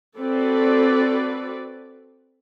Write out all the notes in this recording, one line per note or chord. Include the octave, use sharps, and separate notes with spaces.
C4 F#4 A4 B4 D5